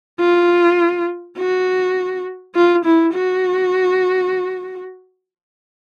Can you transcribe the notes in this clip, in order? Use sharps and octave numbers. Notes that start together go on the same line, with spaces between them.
F4
F#4
F4
E4
F#4